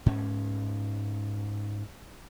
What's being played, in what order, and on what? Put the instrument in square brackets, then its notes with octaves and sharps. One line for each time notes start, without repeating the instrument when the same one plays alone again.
[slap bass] G#2 C#4